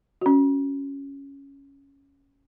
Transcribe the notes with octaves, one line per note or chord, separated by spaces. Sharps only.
C#4 F#4